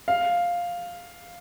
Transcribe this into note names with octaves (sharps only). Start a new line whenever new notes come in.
F5